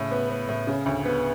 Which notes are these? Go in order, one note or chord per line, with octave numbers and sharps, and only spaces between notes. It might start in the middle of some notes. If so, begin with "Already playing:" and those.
Already playing: A2 C#3
B3
B3
A2
C#3
D2
B3